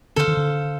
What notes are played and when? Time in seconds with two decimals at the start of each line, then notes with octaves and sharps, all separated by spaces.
0.16 D3 A4 C5 F5
0.28 D#3
0.37 D3